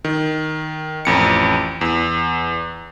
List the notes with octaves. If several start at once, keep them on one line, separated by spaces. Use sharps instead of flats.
D#3
A1 F2 C#7
E2